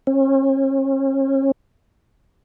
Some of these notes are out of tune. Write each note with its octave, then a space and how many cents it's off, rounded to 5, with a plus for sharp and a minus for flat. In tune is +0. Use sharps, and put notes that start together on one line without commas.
C#4 -40